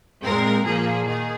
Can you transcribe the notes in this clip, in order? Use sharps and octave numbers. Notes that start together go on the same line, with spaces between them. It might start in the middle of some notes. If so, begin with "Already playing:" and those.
A#2 G#3 C4 A#4
A#2 F3 A#3 G#4
D#3 G#4